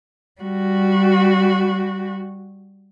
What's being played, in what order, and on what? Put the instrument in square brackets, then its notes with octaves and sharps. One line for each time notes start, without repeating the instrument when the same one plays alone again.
[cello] G3 F#4